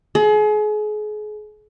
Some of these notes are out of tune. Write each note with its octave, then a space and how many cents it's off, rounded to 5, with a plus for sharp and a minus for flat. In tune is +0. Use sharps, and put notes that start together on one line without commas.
G#4 +35